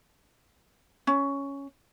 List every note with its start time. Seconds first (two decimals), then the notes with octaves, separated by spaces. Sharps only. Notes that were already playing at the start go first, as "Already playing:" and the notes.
1.07 C#4